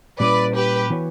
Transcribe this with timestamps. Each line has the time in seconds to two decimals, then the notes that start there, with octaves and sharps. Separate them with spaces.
0.19 A#2 G3 C#4 E4 B4 D5
0.55 G4 B4
0.90 E3 B3 F#4 C#5